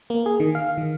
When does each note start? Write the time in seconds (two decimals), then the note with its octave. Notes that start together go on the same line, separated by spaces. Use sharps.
0.10 A#3
0.26 G#4
0.40 D#3
0.55 F5
0.78 D#3